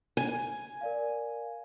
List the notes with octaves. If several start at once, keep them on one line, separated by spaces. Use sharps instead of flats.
G#5
A#4 D5 F5